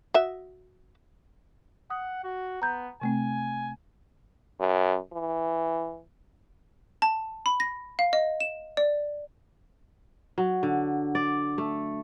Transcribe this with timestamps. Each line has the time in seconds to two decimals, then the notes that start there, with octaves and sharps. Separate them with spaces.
0.14 F#4 D#5 E5
1.90 F#5 D#6
2.24 F#4
2.62 B3 A#5 G6
3.02 C3 A3 C4 G#5
4.60 F#2
5.12 E3
7.02 A5
7.46 B5
7.60 A#6
7.99 F5
8.13 D#5
8.40 E7
8.77 D5
10.38 F#3
10.63 D3
11.15 D5
11.58 A3